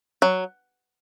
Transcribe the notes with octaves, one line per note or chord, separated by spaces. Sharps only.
F#3